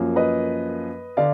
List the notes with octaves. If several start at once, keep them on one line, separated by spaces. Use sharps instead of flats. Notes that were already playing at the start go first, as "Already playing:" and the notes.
Already playing: F#2 F3 A#3
B4 D#5
D3 D5 F5